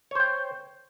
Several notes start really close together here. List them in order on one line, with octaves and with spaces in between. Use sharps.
C#5 C5 G5